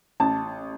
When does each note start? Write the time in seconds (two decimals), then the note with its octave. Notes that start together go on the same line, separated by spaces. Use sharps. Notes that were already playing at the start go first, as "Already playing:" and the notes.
0.20 A1 A5